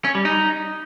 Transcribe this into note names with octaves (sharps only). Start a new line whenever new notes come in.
C#4
G3
D#4